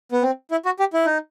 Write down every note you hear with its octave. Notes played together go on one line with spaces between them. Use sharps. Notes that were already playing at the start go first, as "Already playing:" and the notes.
B3
C4
E4
F#4
G4
E4
D#4